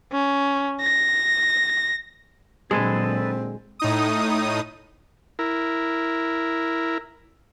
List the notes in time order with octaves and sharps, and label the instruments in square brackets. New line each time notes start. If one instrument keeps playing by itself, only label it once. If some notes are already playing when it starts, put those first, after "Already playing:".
[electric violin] C#4
A#6
[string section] A#2 D3 F#3 [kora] G#3 [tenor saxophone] C4 [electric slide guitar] G#4 A4 B4
[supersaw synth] A2 D#4 D#6
[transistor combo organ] E4 A#4